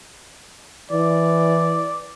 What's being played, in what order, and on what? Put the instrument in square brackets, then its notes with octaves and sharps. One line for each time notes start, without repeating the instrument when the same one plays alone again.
[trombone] E3 [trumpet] D5